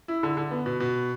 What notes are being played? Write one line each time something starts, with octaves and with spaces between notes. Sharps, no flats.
E4
D3
D3
B3
B2
B2